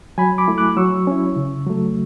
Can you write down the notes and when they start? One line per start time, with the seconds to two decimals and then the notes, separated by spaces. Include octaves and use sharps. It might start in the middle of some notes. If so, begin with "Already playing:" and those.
0.18 F#3 G#5 B5
0.38 B5 D6
0.48 A3 E4
0.58 D6 F#6
0.77 F#3 C#6 E6
1.07 C#4 E4
1.36 C#3
1.66 F#3 A3